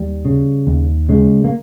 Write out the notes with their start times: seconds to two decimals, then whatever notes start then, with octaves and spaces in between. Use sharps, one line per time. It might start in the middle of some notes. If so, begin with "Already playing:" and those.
Already playing: D#2 G3
0.25 C#3
0.67 D#2
1.09 C#3 G#3
1.44 A#3